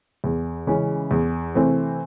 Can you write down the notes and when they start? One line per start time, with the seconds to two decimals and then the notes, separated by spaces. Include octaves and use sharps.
0.24 E2
0.67 C#3 E3 G#3 C#4
1.11 E2
1.54 C3 E3 A3 C4